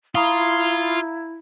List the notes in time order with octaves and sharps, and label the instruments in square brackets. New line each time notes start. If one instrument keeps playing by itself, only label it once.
[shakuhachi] E4 [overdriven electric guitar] F4 [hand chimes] F5 A#5 [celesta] B5 C#6 D#6